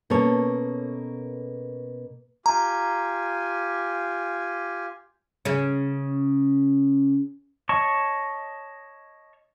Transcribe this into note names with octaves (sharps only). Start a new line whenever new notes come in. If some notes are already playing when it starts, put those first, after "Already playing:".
B2 A#3 C#4 A4 C#5
F4 G4 G#5 A#5
C#3 C#4
C#5 D#5 A5 C#6